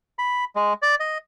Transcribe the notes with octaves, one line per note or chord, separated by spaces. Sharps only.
B5
G#3
D5
D#5